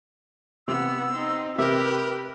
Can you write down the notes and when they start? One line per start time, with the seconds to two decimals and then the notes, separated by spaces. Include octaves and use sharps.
0.68 C3 B3 E6
1.13 C4 D#4
1.58 C3 G4 A#4 B4 E5